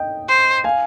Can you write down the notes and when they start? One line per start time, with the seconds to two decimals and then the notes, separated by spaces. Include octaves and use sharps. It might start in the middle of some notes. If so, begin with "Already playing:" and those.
Already playing: D#5 G5
0.28 C5
0.64 F5 G#5